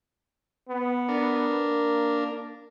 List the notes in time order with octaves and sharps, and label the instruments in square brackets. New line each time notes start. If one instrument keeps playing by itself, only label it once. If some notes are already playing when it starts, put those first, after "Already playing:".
[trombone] B3
[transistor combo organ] D4 A#4
[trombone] A#3